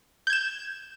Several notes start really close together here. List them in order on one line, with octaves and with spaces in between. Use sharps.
G6 G#6 E7